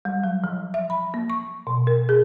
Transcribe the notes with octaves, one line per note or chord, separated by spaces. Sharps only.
G3
F#3
F3
E5
B5
A#3
C#6
B2
A#4
G#4